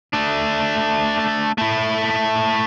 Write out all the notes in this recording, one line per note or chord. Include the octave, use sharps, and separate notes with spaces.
A3 D4
A3 E4